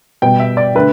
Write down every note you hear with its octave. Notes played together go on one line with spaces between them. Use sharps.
B2 G3 B3 G5
E5
D5
D3 A3 B4